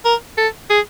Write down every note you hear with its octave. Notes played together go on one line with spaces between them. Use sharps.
A#4
A4
G#4